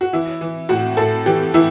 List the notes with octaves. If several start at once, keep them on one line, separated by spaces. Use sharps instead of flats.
F#4
E3 E4
E3
A2 F#4
A2 A4
E3 G4
E3 E4